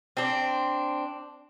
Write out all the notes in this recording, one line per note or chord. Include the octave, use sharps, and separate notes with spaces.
C4 D4